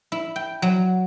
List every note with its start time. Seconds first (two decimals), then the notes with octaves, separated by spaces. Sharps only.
0.12 E4
0.36 G5
0.62 F#3